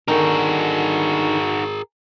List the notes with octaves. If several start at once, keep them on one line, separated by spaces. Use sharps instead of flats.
D3 D#3 D#4 F#4 G#4 A#4